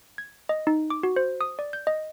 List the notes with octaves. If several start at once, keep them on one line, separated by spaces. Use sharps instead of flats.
G#6
D#5
D#4
D6
F#4
C5
D#6
D5
G6
D#5